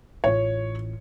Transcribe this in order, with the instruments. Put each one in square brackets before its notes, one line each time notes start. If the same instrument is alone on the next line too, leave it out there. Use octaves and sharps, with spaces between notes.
[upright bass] A1 F4 [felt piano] C#5